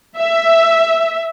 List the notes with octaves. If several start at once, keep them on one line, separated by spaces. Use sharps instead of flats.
E5